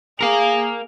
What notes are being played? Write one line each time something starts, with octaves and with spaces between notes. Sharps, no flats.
G#4 A#4 F5